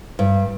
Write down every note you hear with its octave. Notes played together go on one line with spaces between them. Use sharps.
G2